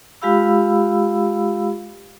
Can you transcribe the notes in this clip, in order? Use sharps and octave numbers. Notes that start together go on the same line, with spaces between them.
G#3 F4 G4 F5 B5 E6